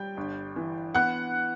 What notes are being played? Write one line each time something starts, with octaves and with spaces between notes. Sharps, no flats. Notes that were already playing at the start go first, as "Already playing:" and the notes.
Already playing: G3 G5 G6
G1
E3
B3 F#5 F#6